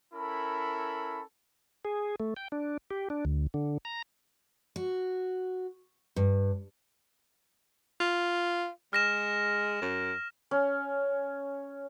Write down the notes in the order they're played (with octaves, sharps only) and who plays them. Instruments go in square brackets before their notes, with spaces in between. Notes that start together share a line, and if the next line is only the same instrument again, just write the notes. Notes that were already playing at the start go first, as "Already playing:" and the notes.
[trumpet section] C#4 E4 A4 A#4 B5
[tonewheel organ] G#4
A3
G5
D4
G4
D4
D2
D3
A#5
[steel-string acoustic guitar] F#4
G2
[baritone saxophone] F4
[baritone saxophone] G#3 [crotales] F6 A#6 E7
[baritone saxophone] F#2
[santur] C#4